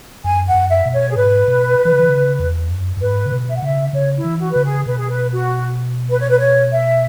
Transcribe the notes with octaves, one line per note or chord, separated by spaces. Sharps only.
F#2 G#5
F#5
F#2
E5
B2
C#5
G#4
G#2 B4
B2
E3
C#3
E3
C#3
E2
F#2
F#2
G#2 B4
C#3
B2
E5
F#5
C#3 E5
C#3 C#5
E4
E3
F#4
C#3 B4
G#4
B2 B4
G#4
B4
F#4
B4
C#5
B4
C#5
E5